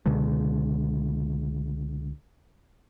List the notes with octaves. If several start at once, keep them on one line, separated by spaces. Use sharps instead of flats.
C#2 B2 D3 G#3